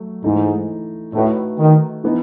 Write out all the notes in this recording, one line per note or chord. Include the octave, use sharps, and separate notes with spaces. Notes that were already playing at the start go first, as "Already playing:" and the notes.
Already playing: F#3 A3
G#2 E3 A3 D#4 A4
A2 A3 D#4 F#4 B4
D#3
E3 B3 D#4